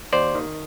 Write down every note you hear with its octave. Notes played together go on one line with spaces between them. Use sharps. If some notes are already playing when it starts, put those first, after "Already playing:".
D#2 C5 D5
D#3